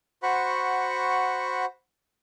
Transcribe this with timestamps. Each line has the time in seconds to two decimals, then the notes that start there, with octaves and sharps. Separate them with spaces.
0.23 F#4 C5 F#5 B5 C#6